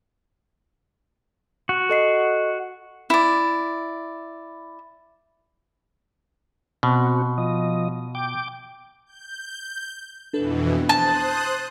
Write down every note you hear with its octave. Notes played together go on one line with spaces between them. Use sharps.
F#4
A4 D#5 C7
E4 D5
B2 C4 F#4
F3 D#5
G5 D6
G6
F2 B2 E3 D4 A4 B4
C5 A5 D#6 F#6